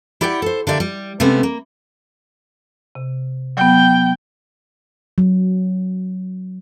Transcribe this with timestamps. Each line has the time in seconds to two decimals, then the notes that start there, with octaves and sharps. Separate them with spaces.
0.21 E4 G4 D5 F#5 G5
0.42 A4 C5
0.67 D3 A#3 G4 D5 E5
0.80 G3
1.20 C3 G#3 A3 B3 C#4
1.43 A#3
2.95 C3
3.57 F#3 B3 G5
5.18 F#3